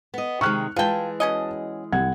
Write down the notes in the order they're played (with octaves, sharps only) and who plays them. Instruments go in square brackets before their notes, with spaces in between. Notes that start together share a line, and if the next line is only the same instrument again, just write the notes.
[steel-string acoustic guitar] B3 D#5
[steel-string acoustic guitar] C3 D#3 G#3 [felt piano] C#6 F6 F#6
[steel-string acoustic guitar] E3 G#3 G#4 [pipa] F4 G5 [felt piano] B4 A5
[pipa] B2 C#4 D#5
[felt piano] C2 F#5 G#6